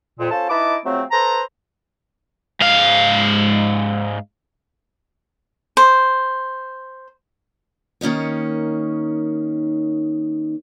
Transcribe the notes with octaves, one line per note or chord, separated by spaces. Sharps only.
F2 A#2
C#4 F4 A4 C5 A5
D#4 E4 B4 D#5 A5 D6
C#3 F3 F#3 A3 C4
A4 B4 C5 A#5
G#2 F5
C5
D#3 A#3 C#4 D#4 C#5